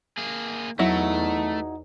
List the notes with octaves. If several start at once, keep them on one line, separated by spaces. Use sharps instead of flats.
A#3 G#4
E2 F#3 A3 D#4 E4